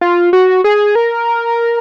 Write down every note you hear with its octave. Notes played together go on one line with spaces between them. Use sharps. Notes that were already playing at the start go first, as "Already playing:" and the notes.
F4
F#4
G#4
A#4